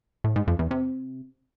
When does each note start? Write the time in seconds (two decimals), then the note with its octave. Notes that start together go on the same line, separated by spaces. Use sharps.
0.24 A2
0.36 G#2
0.48 F2
0.59 E2
0.71 C3